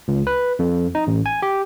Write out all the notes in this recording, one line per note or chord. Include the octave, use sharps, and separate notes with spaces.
C#2
B4
F2
D#4
A1
G#5
G4